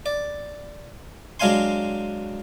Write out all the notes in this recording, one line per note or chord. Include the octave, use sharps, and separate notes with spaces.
D5
F#3 G#3 D4 F5 G#5 C6